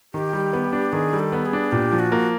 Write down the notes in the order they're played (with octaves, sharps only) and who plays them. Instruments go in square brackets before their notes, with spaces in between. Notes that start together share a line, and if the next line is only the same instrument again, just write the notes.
[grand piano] D#3 [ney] G4
[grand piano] G3
B3
D4
[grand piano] D#3 [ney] G#4
[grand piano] G3
[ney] A4
[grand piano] B3
[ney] G#4
[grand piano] D4
[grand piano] A#2 [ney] G4
[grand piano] F3
[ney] F#4
[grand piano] A#3